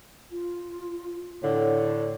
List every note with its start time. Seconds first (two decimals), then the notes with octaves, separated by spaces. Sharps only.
0.32 F4
1.43 A2 D3 C#5